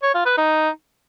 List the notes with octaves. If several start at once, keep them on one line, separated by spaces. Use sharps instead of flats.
C#5
F4
B4
D#4